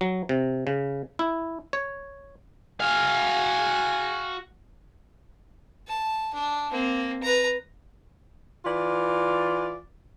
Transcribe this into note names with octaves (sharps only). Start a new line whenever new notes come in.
F#3
C3
C#3
E4
C#5
F#4 F5 G#5
A5
D4
A#3 C4
B4 A#5
E3 F4 D5